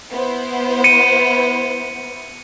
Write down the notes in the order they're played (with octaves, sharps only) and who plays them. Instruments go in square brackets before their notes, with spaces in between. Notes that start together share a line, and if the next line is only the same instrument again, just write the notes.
[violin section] B3 E4 C5
[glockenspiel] C#7 D#7